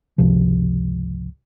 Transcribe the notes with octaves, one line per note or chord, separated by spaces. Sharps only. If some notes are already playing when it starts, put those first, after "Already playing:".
G#1 C#2 C3 F3